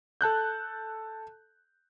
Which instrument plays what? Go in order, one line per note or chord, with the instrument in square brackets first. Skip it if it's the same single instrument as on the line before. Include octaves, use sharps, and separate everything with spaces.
[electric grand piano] A4 A5 F#6 G6